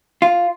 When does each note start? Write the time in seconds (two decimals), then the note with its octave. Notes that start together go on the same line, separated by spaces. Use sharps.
0.22 F4